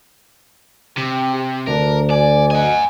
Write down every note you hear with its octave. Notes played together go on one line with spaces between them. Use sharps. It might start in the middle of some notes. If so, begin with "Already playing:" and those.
C3 G4
G4
D2 D4 A#4
D5 G#5
D#5 F#5 G#5